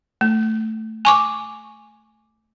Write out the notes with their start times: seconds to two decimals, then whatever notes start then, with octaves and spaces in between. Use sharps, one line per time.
0.21 A3
1.05 G#5 C#6 D6